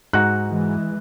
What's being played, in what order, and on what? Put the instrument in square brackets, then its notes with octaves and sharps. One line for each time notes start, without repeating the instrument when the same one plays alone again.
[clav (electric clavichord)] G#2 D#4 F#4 [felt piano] F#6
[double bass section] E3 G#3